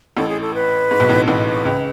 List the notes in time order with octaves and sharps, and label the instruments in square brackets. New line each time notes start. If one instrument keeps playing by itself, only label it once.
[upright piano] A1 A2 [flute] A4
[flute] G#4
A4
B4
[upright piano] G#2
B1 B2
A1 A2
[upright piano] A1 A2 [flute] B4
[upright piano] C#2 C#3